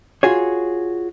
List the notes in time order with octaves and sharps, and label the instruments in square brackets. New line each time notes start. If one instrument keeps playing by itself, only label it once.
[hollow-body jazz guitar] F4 F#4 G#4 C#5